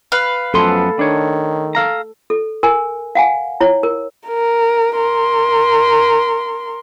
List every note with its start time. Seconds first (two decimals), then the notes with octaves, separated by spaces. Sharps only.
0.12 B4 F5
0.54 F#2 F3 B3 A4 C6
0.99 D#3 D4 C#5
1.75 A4 F5 A#5
2.30 A4
2.63 A#4 G#5
3.15 F5 F#5 G#5
3.60 E4 C#5
3.83 A#4
4.27 A#4
4.96 A#4 C6